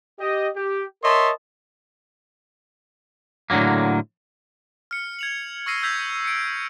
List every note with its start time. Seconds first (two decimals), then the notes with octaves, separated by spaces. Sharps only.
0.19 G4 D#5
0.56 G4
1.03 A#4 C#5 D#5 E5 A5 C6
3.50 A2 D3 D#3 F#3 A#3
4.91 F6 C#7
5.19 G#6 F7 F#7
5.66 C#6 E6 F6 A#6 C7 D#7
5.83 E6 G6 G#6 B6 F7
6.24 C#7 D7